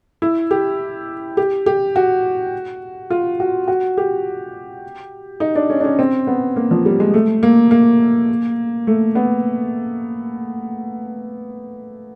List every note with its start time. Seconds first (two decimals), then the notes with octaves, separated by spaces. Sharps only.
0.22 E4
0.51 G4
1.37 G4
1.66 G4
1.96 F#4
3.10 F4
3.40 F#4
3.68 F#4
3.97 G4
5.40 D#4
5.55 D4
5.70 C#4
5.80 D4
5.84 C#4
5.99 C4
6.27 B3
6.56 A#3
6.71 F3
6.86 G3
7.00 G#3
7.14 A3
7.43 A#3
7.71 A#3
8.87 A3
9.15 B3